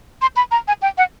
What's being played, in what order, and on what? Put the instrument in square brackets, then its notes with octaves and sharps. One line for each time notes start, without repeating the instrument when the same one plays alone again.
[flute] C6
B5
A#5
G#5
G5
F#5